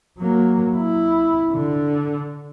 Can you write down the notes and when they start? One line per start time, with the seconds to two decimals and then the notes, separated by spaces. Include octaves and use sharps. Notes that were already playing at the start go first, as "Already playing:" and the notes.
0.19 F#3 A#3
0.77 E4
1.52 D3